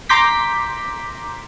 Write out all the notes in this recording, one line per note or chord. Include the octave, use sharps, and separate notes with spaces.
A#5 C6 D6 G6 B6